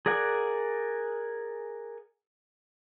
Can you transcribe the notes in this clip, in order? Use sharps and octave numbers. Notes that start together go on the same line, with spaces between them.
G#4 A#4 D5 F#5 G#5